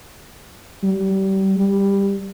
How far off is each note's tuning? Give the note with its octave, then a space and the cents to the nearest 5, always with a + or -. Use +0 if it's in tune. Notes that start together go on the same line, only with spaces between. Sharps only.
G3 -30
G3 +15